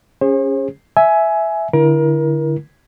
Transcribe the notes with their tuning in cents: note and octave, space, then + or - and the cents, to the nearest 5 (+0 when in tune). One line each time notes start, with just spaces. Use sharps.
C#4 +0 G#4 -30 C5 +45
E5 +0 G#5 +15
D3 +0 E4 +0 A#4 +30